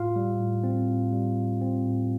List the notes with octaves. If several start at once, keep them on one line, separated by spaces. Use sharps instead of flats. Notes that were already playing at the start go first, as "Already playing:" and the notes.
Already playing: A2 F4 F5
G3
A2
C4
A2
G3
A2
C4
A2